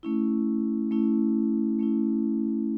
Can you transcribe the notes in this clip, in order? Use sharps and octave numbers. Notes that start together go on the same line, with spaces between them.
A3 C#4 E4
A3 C#4 E4
A3 C#4 E4